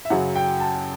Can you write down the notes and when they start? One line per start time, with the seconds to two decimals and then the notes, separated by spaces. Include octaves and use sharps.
0.05 E5
0.10 F#2 C#3 F#3 F#5
0.36 G5
0.60 A5